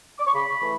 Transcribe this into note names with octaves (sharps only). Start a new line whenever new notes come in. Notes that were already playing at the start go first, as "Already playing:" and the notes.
D6
C#6
C#3 B5
E3 A3